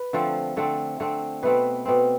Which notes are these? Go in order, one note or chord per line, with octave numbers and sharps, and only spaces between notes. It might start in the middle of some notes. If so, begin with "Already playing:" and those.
Already playing: B4
D3 F3 A3 C4
D3 A3 C4
D3 A3 C4
B2 A3 C4 B4
B2 A3 C4